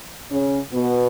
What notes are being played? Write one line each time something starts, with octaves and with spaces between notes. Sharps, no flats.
C#3 C#4
B2 B3